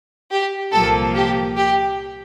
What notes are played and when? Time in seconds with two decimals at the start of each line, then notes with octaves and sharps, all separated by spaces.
0.31 G4
0.72 C2 A#2 F3 A#3 A4
1.14 G4
1.56 G4